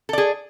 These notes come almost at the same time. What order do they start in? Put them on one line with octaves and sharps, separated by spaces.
A4 D5 G#4